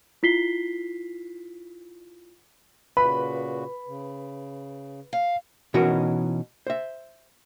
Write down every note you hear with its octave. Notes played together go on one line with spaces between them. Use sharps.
E4 F4 B6 C7 G7
A#2 C#3 F#4 B4 B5
C#3
F5
B2 E3 C#4 D#4 F#4 A#4
C5 E5